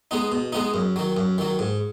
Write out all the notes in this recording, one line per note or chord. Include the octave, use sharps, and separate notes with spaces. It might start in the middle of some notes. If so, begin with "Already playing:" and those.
G#3 B3 D#4
B2
G#3 B3 D#4
F#2
D#3 F#3
F#2
D#3 F#3
G#2